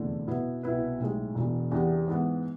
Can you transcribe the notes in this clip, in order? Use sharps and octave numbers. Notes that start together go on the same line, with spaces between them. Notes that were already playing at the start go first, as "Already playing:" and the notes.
Already playing: F1 E2 D3 A3
B2 B3 E4 B4
C2 B2 B3 E4 B4
B1 A2 G#3
E1 E2 B2
E2 C3 E3 B3 D4
G#2 E3 B3